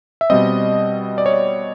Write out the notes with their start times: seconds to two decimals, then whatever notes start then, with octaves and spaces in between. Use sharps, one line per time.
0.21 E5
0.30 B2 G3 C4 D#5
1.18 D5
1.26 C#5
1.34 D5